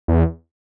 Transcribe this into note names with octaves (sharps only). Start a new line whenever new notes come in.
E2